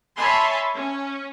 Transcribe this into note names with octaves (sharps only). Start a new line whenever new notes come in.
C#5 E5 G#5 A5 B5 C6
C#4